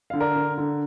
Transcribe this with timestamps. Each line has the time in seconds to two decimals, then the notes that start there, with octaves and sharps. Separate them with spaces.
0.10 D3 F5
0.20 A#4 D5
0.36 D3
0.58 D3